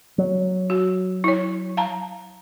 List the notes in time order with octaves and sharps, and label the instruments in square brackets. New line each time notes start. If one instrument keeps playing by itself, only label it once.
[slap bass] F#3
[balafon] F#4
E4 C#5
F5 A5 A#5